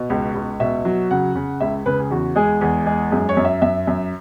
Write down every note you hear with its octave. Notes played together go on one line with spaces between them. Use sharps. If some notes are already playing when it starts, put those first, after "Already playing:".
Already playing: B2
C#2
C#2
B2 E5
F#3
C#3 F#5
C#3
C#2 E5
C#3 B4
G#4
E2 F#4
G#3 G#4
E2 G#4
G#3 G#4
F#2 G#4
C#5
F#2
E5
F#2 E5
F#2